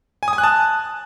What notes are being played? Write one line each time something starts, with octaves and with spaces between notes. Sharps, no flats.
G#5
D#6
G#5
F#6
A5